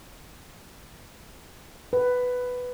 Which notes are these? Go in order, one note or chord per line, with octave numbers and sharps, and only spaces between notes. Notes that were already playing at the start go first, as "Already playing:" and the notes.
B4